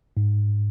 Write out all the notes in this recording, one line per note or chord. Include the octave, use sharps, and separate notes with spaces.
G#2